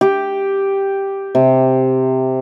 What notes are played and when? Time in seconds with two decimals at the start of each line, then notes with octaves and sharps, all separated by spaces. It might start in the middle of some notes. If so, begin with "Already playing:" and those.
0.01 G4
1.35 C3